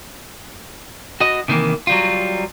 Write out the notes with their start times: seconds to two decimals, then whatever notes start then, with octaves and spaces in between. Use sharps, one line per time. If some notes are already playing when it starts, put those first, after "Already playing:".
1.21 F#4 D#5
1.48 C3 D#3 E3 A#3
1.87 F#3 G3 F4